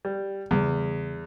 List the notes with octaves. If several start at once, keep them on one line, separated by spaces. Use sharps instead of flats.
G3
E2 C#3 G3 B3